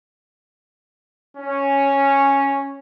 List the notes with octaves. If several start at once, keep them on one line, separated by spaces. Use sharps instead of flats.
C#4